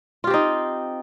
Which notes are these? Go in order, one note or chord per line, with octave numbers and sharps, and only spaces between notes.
C4 D#4 F4 G4